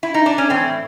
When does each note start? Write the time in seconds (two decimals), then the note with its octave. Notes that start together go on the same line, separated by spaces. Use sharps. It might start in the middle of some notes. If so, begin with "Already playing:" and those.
0.03 E4
0.14 D#4
0.26 D4
0.38 C#4
0.50 A2 E3 C4